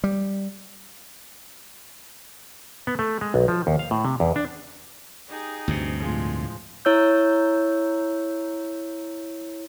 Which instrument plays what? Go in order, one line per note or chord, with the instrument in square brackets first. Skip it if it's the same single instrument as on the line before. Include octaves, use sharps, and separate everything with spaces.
[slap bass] G3
[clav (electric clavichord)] B3
A3
G#3
B1
F3
D#2
F5
A2
C3
E2
D4
[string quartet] D#4 G4 G#4
[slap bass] D2 G2 C3
[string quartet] A2 F3 G#3
[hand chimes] E4 C#5 E6 G6